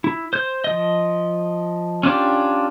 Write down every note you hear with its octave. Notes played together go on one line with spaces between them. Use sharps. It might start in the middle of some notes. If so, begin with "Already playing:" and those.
E4
C5 G6
F3 D#5
C#4 D4 F4 G4